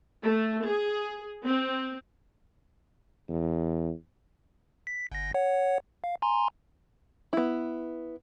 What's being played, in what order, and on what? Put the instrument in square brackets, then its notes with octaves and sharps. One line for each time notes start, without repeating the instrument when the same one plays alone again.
[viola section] A3
G#4
C4
[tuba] E2
[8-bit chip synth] B6
G1 A#6
C#5 F#5
F5
G#5 A#5 C6
[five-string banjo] B3 E4